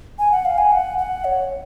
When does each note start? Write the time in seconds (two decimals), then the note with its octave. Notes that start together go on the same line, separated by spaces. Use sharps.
0.19 G#5
0.32 F#5
0.45 F5
0.58 G#5
0.72 F#5
0.98 F#5
1.25 C#5